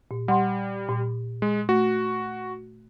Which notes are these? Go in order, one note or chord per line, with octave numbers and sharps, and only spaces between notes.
A#2
G3 F#5 C6
A#2
G#3
A3 F#4